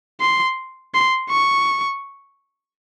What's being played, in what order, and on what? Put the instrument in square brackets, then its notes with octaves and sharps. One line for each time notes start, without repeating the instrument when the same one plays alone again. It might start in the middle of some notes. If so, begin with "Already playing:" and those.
[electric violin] C6
C6
C#6